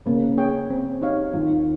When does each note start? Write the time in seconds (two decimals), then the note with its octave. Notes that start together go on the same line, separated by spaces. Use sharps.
0.06 C#3 A#3
0.38 C#4 G#4 C#5 G5
0.70 C4
1.01 D#4 G4 C#5 F5
1.33 D#2 D#3 F4